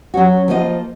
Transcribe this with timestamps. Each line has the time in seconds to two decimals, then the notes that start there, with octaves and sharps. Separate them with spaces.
0.14 F#3 C#4 F#4
0.48 F3 A#3 F4 B4 D#5